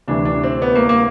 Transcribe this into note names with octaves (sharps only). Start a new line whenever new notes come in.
D2 C3 E3 D4
D4
C4
B3
A#3
A#3